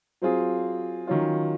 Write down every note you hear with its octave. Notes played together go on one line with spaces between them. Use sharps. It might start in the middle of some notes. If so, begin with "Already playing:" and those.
F#3 C4 F4 G#4
D#3 F#3 C#4 F4